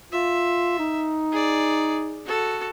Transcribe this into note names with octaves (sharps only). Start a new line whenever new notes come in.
F4 E5
D#4
G#4 D5
F#4 A4